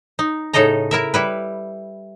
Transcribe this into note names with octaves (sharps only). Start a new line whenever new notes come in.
D#4
A2 C#3 D#4 A4 D#5 A#5
E4 A#4 E5
G3 E4 B4